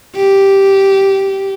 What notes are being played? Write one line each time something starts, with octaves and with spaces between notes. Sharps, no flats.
G4